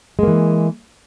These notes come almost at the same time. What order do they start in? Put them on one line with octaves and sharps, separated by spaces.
G#3 A#3 E3